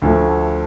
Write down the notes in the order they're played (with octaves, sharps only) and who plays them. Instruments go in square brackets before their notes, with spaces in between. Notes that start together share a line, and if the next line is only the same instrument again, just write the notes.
[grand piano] D2 D3 F3 A3